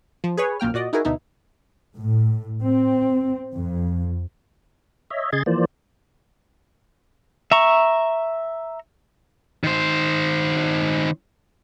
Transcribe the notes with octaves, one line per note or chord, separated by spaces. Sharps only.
F3
G#4 B4 C#5
A#1 F#2 A#3 G5 F6
A#2 F#4 D5 D#5
D#4 E4 F#4 G#4 A#4
D2 B2 D#4 E4
A2
C4
F2
C#5 D#5 E5
C#3 G#4 D#5 C6 G#6 A6
E3 F3 A#3 C5 D5
E5 A#5 C#6
D#3 C5